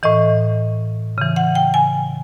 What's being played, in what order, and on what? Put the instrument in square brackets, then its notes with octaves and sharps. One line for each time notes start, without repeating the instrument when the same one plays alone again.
[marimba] A2 E3 D#5
C#3 E3
F#5
G5
G#5